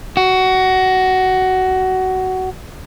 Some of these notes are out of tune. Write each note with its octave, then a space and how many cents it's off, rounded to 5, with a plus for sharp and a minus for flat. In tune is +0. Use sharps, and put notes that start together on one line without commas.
F#4 +15